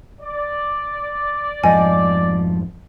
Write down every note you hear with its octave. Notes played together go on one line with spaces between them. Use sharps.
D5
F2 G#2 F3 D#5 G#5